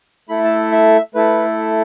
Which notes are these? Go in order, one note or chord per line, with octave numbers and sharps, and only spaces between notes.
A3 E4 A4 B5
A5
E5
A3 E4 A4 B4